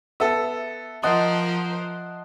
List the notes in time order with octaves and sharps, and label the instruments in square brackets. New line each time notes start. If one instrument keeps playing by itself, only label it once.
[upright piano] B3 A4 [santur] E5
[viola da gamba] F3 A#4 C5 [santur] D#5 F#5 A5 [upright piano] D#6